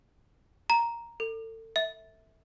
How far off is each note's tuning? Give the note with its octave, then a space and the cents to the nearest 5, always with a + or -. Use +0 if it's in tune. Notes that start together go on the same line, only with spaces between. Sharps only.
A#5 +5
A4 +35
E5 -20